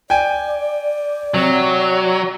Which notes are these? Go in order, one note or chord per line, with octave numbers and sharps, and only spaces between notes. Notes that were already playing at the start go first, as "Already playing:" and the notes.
D5 G5 G#5
C3 F#3